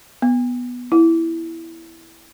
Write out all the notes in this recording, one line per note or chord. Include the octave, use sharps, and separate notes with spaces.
B3
E4